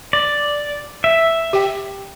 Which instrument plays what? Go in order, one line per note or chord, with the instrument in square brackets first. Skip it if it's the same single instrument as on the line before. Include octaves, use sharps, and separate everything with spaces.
[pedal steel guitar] D5
E5
[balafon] G4 G5